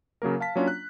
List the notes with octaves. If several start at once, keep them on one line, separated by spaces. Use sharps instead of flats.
C#3 F#3 A#3 A#4
F5 A5 B6
F#3 A#3 C#4 D4 F4
F#6